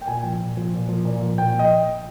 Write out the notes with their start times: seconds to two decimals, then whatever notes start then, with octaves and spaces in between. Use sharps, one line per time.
0.01 G5
0.07 A#2 G#5
0.24 F3
0.41 A#2
0.57 F3
0.74 A#2
0.89 F3
1.05 A#2
1.22 F3
1.38 A#2 G5
1.54 F3 D#5